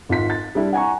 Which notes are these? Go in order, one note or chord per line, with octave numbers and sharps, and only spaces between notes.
G#1 F4 B6
A6
G3 D4 E4
F#5 G#5 A#5 C#6